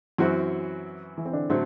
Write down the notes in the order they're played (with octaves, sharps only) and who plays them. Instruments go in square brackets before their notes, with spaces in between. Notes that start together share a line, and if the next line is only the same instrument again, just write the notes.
[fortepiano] F#2 F#3 C4 F#4 [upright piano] E3 E4
[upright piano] E3 E4
C4
D3 D4
[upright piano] A2 [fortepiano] D3 F#3 A3 C4